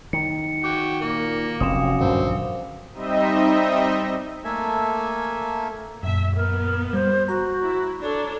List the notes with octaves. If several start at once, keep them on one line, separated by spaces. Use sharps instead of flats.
D#3 C#7
F#4 G5 D6
A#2 A#3
F1 F#2 C4 F5 D#6 E7
A#1 G2 D3 C4
G3 C4 D#4 D#5 E5
A3 A#3 A4 E5 G#5
F#2 A#2 E5
B3 A#4
G3 C5
F#4 A#5
E4
D4 A4 C#5 D5